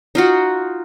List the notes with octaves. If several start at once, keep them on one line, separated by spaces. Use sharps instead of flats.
D#4 F4 F#4